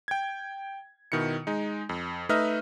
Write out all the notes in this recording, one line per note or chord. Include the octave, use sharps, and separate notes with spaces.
G5 G#6
B2 D#3 E4 C#7
G#3 D#4
F2
A3 D#4 B4 D#5 E5 F6